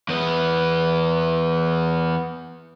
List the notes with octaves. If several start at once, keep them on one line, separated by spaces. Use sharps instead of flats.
E2 B3